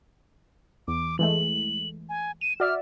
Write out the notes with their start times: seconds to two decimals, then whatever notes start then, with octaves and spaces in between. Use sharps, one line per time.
0.88 E2 D6
1.19 E3 G#3 A3 F#7
2.09 G#5
2.41 D#7 E7
2.60 F#4 D5 E5 F6